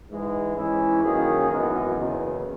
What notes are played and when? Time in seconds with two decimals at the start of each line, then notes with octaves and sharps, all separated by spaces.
0.09 G#2 E3 G#3
0.56 G#2 E3 G#3 C#4 E4
1.03 F#2 D#3 A#3 C#4 G#4
1.50 G#1 F#2 E3 B3 D#4
1.97 F#1 E2 C#3